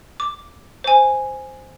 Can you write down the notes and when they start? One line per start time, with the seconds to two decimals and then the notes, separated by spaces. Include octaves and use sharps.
0.20 D6
0.84 C5 G#5